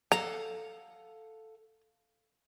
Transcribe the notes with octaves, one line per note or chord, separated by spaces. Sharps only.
A4 F5 F#5 A#5